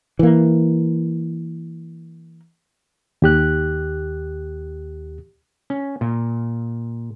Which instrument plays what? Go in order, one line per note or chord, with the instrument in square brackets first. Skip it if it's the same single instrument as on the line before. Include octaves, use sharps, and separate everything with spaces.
[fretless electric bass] E3 A#3
[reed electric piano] D#2 G4 F#6
[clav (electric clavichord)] C#4
A#2